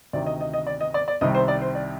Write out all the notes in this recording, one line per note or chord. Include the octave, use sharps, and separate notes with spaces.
D2 C3 D#3 D5
D#5
D#5
D#5
D5
D#5
D5
D5
C2 C3 D#3 G3 D#5
C5
D5
C5
D5